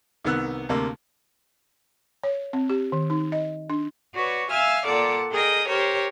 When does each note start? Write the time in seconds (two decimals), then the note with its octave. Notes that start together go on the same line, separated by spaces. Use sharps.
0.24 C2 D#3 B3 E6 F#6
0.69 D2 C3 A#3
2.23 C#5
2.53 C4
2.70 G4
2.92 D#3
3.10 D#4
3.32 D#5
3.70 D4
4.14 F#4 B4 C#5 D5
4.50 E5 F5 G#5 E6 F6
4.85 A#2 A4 D5 F#5 D6
5.31 G#4 A#4 D#5 G5
5.68 G4 A#4 C5 C#5